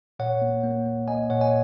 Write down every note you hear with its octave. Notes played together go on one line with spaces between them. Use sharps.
A#2 C#5 F#5
A#3
A#3
A#3
A#3 D#5 G#5
A#2 C#5 F#5
D#5 G#5